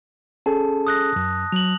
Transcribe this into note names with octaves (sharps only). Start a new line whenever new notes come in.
C#4 G#4 A4 A5
D#6 F#6 A#6
F#2
F#3 F7 F#7